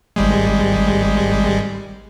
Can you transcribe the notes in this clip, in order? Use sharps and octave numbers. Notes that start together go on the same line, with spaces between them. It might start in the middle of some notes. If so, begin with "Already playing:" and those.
G#1 G3 G#3